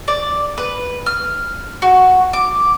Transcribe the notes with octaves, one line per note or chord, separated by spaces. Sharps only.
D5
B4
F6
F#4
D6